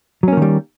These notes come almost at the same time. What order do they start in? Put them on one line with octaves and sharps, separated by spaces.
F#3 C#4 A#3 D#3 G3